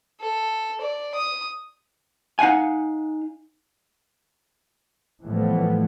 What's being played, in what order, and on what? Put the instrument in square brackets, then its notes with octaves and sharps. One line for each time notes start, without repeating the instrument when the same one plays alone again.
[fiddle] A4
D5
D#6
[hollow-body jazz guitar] D#4 F5 F#5 G#5
[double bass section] A2 E3 F3 G3 A3 B3